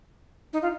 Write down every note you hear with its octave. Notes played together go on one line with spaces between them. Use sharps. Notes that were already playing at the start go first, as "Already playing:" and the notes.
D#4
F4